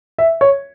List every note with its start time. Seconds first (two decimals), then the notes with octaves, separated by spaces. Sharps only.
0.18 E5
0.41 C#5